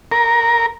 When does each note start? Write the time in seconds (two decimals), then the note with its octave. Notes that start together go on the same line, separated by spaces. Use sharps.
0.12 A#4